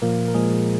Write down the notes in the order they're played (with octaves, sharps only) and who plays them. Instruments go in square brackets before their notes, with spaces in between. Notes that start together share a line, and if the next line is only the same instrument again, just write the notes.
[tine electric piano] A#2 F3 A#3 A#4
A#4
A#2 F3 G#3 G#4